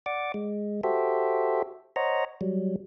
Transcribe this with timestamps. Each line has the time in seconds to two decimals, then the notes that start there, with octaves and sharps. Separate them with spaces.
0.06 D5 F#5 D6
0.34 G#3
0.84 F#4 G4 A4 C5 E5
1.96 C5 C#5 D#5 F#5 A#5
2.41 F#3 G3